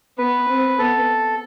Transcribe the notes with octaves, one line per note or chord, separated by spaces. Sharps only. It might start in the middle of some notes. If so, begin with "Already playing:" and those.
B3 B4
C4
B3 A4